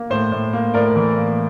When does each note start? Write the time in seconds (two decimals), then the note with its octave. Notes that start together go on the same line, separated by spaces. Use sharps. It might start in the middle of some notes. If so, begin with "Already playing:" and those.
Already playing: A#3
0.10 A2 C5
0.32 A2
0.53 A#3
0.74 A2 A#4 D5
0.95 E3
1.17 A#3